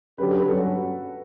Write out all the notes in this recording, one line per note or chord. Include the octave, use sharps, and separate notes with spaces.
D3 F#3 C#4 G4 B4
A4
B4
G2 F#3 C#4 A4
F#4